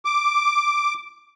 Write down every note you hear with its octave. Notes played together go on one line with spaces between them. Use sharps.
D6